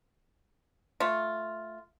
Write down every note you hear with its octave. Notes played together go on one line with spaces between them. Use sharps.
A3 F4